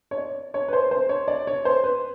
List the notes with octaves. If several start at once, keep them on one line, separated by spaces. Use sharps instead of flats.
C#5
D5
C#5
B4
C5
C5
C#5
D5
C#5
C5
B4